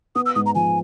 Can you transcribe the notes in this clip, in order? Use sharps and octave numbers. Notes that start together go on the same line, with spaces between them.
B3 D#6
E6
G#2 D#6
A#5
F3 G#5